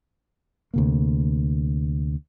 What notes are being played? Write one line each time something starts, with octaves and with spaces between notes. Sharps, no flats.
D2 C3 A#3